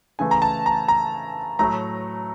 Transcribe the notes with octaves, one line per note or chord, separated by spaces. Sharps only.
C#3 E3 A3 G#5
A#5
A5
A#5
A#5
A2 F#3 A3 A#5